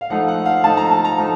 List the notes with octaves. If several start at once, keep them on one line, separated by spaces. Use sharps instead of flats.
F5
F3 A3 D#4 F#5
F#5
F5
F3 A3 D#4 A5
A#5
A5
A#5
F3 A3 D#4